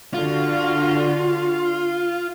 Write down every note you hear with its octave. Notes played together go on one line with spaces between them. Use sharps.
D3 F4 F#4